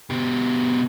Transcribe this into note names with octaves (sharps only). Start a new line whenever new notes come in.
B2 G4